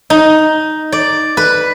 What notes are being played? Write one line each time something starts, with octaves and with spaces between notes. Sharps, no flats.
D#4
D5
B4